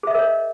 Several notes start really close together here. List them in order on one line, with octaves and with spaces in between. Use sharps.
G#4 E5 D#5 A#4 C#5